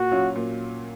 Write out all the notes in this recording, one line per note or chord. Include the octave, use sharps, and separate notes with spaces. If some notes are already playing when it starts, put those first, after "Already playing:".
Already playing: A#2 F#4
F#3 C#4 F4
A#2